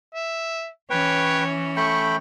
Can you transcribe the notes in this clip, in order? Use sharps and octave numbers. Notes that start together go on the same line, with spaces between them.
E5
E3 C#4 B4 C#5 G5
A3 G5 B5 C#6